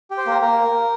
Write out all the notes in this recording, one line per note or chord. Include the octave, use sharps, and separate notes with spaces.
G4
C5
A#3 A#4
A#3 A#4